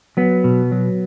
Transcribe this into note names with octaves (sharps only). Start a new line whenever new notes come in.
F#3 B3
B2
F#3